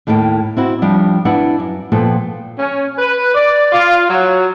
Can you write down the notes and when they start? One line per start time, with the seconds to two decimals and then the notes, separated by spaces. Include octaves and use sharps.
0.07 D#2 A2 A#3 A4 G5
0.57 C4 E4 F#4
0.82 F3 G3 D4 G4
1.25 D4 E4 B4 F#5
1.60 F#2
1.92 A#2 F3 B3 A4 G5
2.58 C#4
2.98 B4
3.33 D5
3.71 F4
4.09 F#3